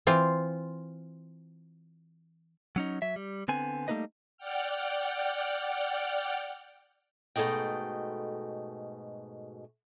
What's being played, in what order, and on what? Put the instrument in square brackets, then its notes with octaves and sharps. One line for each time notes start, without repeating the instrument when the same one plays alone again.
[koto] E3 C4 F4
[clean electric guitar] F#3 C#4 D#4
F#3 E5
G3
D3 B3 C4 G#5
G3 A3 A#3 D#4 B4 D#5
[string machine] D5 F#5 G5 F6
[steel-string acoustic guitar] G#2 B2 A3 D#5 G5